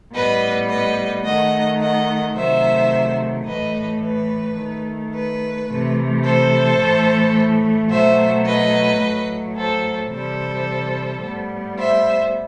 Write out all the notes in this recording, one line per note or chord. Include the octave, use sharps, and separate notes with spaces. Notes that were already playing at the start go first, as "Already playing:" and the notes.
A2 G3 B3 B4 D#5
B4 D#5
D#3 A3 D#5 F#5
D#5 F#5
C3 D#3 F#3 A3 C5 E5
A2 E3 A3 B4 D#5
B4
D#3 A3
B4
C3 E3 A3
A4 C5
A2 E3 A3
B2 F#3 A3 C5 E5
B4 D#5
A2 F#3 A3
A4 C5
C3 E3 G3 A4 C5
A2 G3 B3
C5 E5